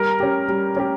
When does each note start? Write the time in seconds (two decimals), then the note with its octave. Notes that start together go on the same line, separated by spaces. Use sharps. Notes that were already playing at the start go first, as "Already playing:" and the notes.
Already playing: G3 A#4
0.20 C#4 G4
0.48 G3
0.77 C#4 G4